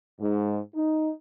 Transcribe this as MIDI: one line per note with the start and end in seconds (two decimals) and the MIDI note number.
0.20 0.57 44
0.74 1.12 63